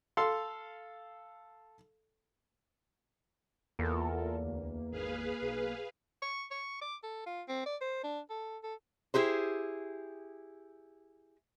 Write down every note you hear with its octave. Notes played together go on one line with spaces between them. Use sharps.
A4 F5 C6
E2 A#3 F4 A4 A#4
D2
G#1 G#4 B4 F5
B1
C#6
C#6
D6
A4
F4
C4
D5
C5
D4
A4
A4
E4 G4 G#4 C5